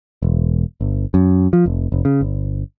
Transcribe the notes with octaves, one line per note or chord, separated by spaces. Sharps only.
E1
G1
F#2
F3
F1
F1
C#3
G1